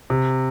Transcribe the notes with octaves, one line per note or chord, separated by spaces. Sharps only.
C3